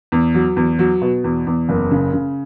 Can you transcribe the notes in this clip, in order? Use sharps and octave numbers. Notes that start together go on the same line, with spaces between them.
E2
F#3
E2
F#3
B2
E2
E2
F#1
C#3
C#3